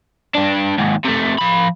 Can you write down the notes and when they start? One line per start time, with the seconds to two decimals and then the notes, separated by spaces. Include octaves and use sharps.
0.35 G2 D4
0.79 D#2 G#2
1.05 C3 A3
1.38 F3 B5